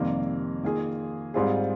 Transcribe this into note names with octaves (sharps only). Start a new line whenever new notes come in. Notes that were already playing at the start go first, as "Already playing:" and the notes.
Already playing: F2 C3 D#3 G3 A#3
D#3 A#3 F4 G#4
G#2 G3 C4 F4 G#4